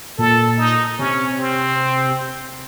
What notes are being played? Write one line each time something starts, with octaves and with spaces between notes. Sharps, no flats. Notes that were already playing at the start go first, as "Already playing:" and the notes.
A#2 A4
D#4
C3 C#4
C4